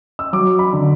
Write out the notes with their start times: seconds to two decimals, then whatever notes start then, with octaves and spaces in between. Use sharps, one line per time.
0.19 E6
0.33 F#3 D6
0.59 B5
0.73 D3